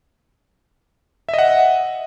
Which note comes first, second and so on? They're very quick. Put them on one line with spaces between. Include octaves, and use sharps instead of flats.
E5 D#5 F#5